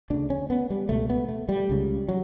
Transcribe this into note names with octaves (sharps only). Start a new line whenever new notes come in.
D2 C#3 D4
C#4
B3
G3
C#2 B2 A3
B3
A3
G3
C#2 C#3
F#3